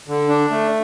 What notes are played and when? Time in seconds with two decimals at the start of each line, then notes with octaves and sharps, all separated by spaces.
0.08 D3
0.29 D4
0.50 A3